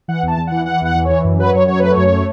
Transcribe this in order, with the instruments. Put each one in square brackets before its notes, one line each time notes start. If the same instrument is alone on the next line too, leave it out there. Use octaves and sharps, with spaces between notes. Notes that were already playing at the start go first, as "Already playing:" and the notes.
[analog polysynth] E3 F#5
E2 A5
E2
E3 F#5
E3 F#5
E2 F#5
E3
E3 C#5
F#2
F#3 B4
F#2 C#5
F#3 C#5
A3 B4
C#5
F#2
A3